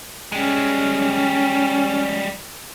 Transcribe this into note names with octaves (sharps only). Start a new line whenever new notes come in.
G3 G#3 C#4